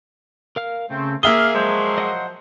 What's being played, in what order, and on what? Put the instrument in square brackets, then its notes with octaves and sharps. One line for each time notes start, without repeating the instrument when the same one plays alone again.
[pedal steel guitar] A#4 F5 F6
[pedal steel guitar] C#3 [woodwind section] A3 C4
[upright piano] A#3 E5 G7 [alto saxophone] G#4 [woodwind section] F5 [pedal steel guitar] D#6
[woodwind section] F3 F#3 C5 [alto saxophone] G#3
[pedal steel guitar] D#5 F#5